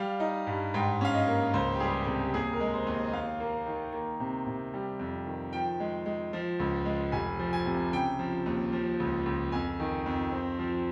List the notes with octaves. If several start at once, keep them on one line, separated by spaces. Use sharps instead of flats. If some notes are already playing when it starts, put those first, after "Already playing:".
Already playing: G3 F5
D#4
G2
G#2 G5
C#4 F5
D#5
A#3
C#2 C5
G4
G3 G#4
C3 G#4
G4
D#2 G#4
A#4
G#3
C5
D#2
D#5
D#5
D#2 F5
A#3
D#3
A#3
C3
C3
G3
F2
D#3
F3 G5
G#3
G#3
F3
C#2
G#3
F1 G#5
F3
G#5
C3
C#3 G5
F3
D#2
F3
C#2
C#2
F2 G#5
D#3
F2
C4
F3